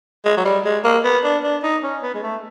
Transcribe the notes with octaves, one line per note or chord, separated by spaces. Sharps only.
G#3
F#3
G3
G#3
A#3
B3
D4
D4
D#4
C#4
B3
G#3
A3